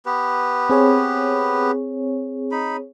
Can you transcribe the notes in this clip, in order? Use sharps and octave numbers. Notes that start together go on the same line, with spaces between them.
B3 G4 B4
C4 G#4 C#5
D#4 B5